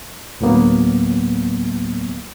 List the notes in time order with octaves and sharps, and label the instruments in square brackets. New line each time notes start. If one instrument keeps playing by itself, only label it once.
[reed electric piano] D2 A2 F#3 A#3 B3